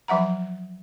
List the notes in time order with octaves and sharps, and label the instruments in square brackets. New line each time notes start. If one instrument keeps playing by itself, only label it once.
[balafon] F3 F#3 E5 F#5 A#5